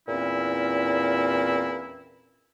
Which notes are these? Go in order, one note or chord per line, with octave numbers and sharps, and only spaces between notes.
E2 A#2 C4 C#4 E4